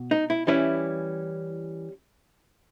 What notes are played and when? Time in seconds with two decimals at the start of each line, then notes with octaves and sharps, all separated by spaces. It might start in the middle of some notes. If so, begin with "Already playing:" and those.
Already playing: B2
0.11 D#4
0.30 E4
0.47 E3 G3 C#4 E4